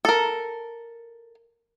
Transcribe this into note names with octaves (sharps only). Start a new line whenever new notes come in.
A4 A#4